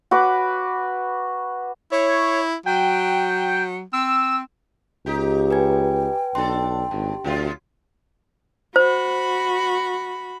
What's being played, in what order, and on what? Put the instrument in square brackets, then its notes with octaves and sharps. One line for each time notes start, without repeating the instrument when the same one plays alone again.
[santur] F#4 B4 D6
[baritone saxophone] E4 [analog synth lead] C#5
[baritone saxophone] F#3 [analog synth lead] G5
[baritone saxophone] C4 [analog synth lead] E6
[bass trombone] C#2 [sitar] D#4 G4
[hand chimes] B4 G#5 G#6 [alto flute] G5
[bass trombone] B1 [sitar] D4 A4 [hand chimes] C6
[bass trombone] G#1 [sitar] G2
[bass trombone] D2 [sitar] B2 F#3 F4
[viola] F#4 B5 [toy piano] C5